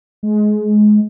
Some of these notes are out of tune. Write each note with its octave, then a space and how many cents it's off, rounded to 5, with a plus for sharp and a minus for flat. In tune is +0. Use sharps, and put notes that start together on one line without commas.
G#3 +20